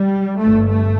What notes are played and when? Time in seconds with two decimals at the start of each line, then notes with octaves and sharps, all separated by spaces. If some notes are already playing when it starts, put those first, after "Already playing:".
Already playing: G3
0.39 G1 G2 A3
0.69 A3